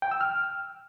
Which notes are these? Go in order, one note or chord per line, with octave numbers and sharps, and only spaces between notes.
G5
E6
F6